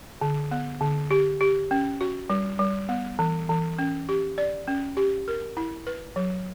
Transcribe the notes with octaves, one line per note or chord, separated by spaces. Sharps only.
D3
B3
D3
G4
G4
C#4
F#4
G3
G3
B3
E3
E3
C#4
G4
D5
C#4
G4
A#4
E4
B4
F#3